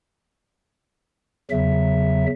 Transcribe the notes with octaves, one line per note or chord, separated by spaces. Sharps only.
E2 C#3 F#3 E5